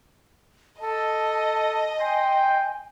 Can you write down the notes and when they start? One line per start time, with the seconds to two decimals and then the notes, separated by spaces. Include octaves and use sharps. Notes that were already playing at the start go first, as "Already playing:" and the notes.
0.81 A4 D#5 A5
2.00 G5 G#5 C6